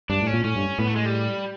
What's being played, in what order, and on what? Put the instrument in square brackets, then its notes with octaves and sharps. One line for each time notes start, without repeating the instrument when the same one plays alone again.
[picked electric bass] G2 [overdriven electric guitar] D4
[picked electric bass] A2
[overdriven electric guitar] C#4
[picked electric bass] A#2
[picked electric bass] A2 [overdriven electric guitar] C#4
[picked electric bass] G2
[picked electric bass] A2 [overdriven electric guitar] B3
[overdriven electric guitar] A3
G#3
G3